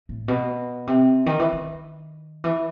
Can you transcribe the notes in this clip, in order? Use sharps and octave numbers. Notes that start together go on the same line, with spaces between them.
A2
B2
C3
D#3
E3
D#3
E3